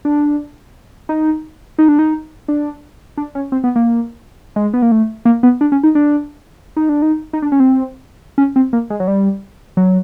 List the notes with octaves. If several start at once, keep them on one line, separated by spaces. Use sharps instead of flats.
D4
D#4
D#4
D4
D#4
D4
D4
C#4
C4
B3
A#3
G#3
B3
A#3
A3
A#3
B3
D4
C#4
D#4
D4
D#4
D4
D#4
D#4
D4
C#4
C4
C#4
C4
A#3
G#3
F#3
G3
F#3